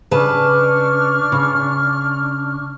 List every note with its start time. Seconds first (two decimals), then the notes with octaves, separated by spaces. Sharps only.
0.11 C#3 D4 B4 A5 C#6 F6
1.32 C#3